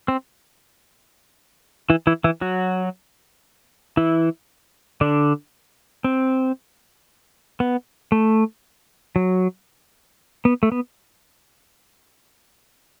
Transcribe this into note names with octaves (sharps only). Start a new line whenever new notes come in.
C4
E3 E4
E3 E4
E3 E4
F#3 F#4
E3 E4
D3 D4
C4
B3
A3
F#3
B3
A3
B3